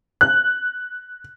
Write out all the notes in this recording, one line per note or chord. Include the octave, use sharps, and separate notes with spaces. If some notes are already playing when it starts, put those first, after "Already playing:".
F#6